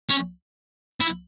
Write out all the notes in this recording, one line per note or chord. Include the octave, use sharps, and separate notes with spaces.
C#4
E4